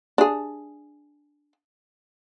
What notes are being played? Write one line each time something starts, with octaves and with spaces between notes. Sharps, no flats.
D4 G#4